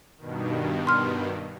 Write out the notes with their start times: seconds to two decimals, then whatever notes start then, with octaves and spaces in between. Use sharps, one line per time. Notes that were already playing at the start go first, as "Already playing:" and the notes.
0.17 G2 B2 D#3
0.87 C6 F6